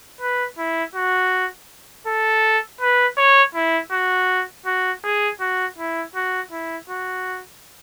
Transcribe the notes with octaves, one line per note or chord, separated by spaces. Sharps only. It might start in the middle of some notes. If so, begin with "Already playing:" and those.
B4
E4
F#4
A4
B4
C#5
E4
F#4
F#4
G#4
F#4
E4
F#4
E4
F#4